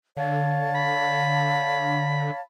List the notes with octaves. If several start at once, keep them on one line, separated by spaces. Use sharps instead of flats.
D3 C#5 F5 A5
B5